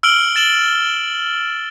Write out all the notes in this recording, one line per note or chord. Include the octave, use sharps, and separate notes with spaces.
E6 F6 D7 F#7 G7
A6 E7 F#7 G7